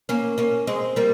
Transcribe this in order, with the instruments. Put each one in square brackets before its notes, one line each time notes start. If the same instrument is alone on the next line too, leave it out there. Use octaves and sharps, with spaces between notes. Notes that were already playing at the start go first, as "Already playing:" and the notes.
[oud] A#3 C#4
A#3 C#4
G#3 C4
G3 A#3